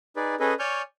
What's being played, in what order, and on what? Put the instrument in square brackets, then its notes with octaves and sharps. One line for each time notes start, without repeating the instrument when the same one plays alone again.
[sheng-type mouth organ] D#4 G#4 B4 D5
C#4 G#4 A4 B4 D#5
C#5 D5 G#5 C#6 F6 G6